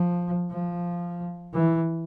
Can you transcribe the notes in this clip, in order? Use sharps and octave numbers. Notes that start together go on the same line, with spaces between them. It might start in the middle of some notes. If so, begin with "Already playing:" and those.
Already playing: F3
F3
E3